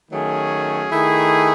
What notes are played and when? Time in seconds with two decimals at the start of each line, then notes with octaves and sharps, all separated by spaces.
0.11 D#3 F#3 A3 C#4 G#4
0.90 D#3 A3 E4 G#4